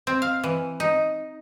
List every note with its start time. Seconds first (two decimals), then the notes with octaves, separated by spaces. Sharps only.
0.07 C4
0.22 F5
0.44 E3
0.80 D#4